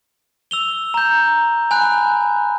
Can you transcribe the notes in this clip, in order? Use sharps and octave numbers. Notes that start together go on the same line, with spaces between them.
E6 F7 G7
A#5 G6
G#5 B5 F#6